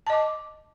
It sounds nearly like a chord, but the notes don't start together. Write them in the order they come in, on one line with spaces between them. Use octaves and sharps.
A5 D#5 D6